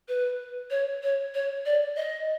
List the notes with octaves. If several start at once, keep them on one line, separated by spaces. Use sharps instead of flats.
B4
C#5
C#5
C#5
D5
D#5